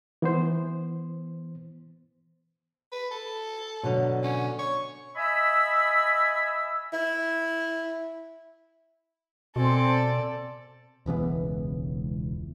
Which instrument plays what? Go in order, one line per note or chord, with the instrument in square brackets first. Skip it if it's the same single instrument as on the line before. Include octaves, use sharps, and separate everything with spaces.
[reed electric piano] E3 B3 C5
[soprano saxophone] B4
A4
[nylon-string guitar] B2 D3 F#3
[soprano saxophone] C#4
C#5
[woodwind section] D#5 E5 G#5 B5 E6
[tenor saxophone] E4
[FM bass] B2 [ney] C4 [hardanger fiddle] A4 D5 [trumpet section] G#5 A5 C6
[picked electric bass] E1 C#2 E3 B3